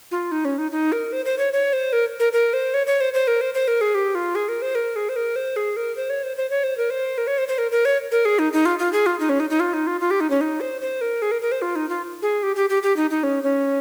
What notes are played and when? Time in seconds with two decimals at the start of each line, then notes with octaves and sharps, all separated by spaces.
0.11 F4
0.32 D#4
0.45 C#4
0.58 D#4
0.71 D#4
0.92 A#4
1.12 C5
1.26 C5
1.38 C#5
1.53 C#5
1.73 C5
1.93 A#4
2.20 A#4
2.33 A#4
2.53 C5
2.74 C#5
2.87 C#5
3.01 C5
3.14 C5
3.28 A#4
3.41 C5
3.54 C5
3.68 A#4
3.81 G#4
3.95 G4
4.15 F4
4.35 G#4
4.49 A#4
4.62 C5
4.75 A#4
4.96 G#4
5.09 C5
5.16 A#4
5.36 C5
5.56 G#4
5.77 A#4
5.97 C5
6.10 C#5
6.23 C5
6.37 C5
6.50 C#5
6.64 C5
6.78 A#4
6.90 C5
7.18 A#4
7.27 C#5
7.38 C5
7.48 C5
7.58 A#4
7.71 A#4
7.85 C#5
8.12 A#4
8.25 G#4
8.39 D#4
8.53 D#4
8.66 F4
8.79 F4
8.93 G#4
9.06 F4
9.20 D#4
9.29 C#4
9.40 D#4
9.50 D#4
9.60 F4
9.74 D#4
9.87 F4
10.01 F4
10.11 G4
10.20 D#4
10.30 C#4
10.41 D#4
10.61 C5
10.81 C5
11.01 A#4
11.22 G#4
11.31 A#4
11.42 A#4
11.52 C5
11.62 F4
11.76 D#4
11.89 F4
12.22 G#4
12.43 G4
12.56 G4
12.70 G4
12.83 G4
12.97 D#4
13.10 D#4
13.23 C#4
13.43 C#4